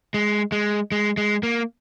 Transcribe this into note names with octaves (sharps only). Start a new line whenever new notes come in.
G#3
G#3
G#3
G#3
A#3